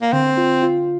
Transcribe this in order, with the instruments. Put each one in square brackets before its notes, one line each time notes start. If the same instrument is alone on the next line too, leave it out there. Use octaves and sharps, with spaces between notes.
[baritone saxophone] A#3
[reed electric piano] D3 [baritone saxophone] C4
[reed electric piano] F4
F4